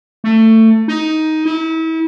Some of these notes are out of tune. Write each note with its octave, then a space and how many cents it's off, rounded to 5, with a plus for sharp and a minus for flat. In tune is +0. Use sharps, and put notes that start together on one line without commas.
A3 +20
D#4 +10
E4 -35